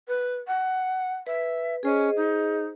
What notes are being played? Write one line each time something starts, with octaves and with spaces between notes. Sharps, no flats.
B4
F#5
B4 E5
C#4 G#4 C5 D#5
D#4